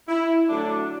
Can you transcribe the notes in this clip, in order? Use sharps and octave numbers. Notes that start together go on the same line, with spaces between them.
E4
D3 F#3 A3 D4